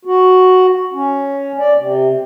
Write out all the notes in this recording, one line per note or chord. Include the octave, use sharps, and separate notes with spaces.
F#4
C#4
D5
C3